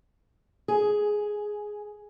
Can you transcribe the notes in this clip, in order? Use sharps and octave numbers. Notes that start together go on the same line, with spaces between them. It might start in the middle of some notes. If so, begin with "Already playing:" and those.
G#4